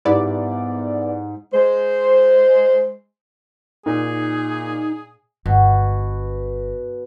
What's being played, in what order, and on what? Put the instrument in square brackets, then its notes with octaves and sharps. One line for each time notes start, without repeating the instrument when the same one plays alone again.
[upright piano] G#2 G3 [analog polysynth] B3 E4 D5
[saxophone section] G#3 C5
[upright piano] A#2 [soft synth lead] D#4 [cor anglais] G#4
[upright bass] G1 [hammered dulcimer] B2